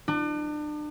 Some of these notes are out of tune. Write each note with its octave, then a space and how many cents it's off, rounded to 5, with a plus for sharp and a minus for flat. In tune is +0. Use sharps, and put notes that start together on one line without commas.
D4 +35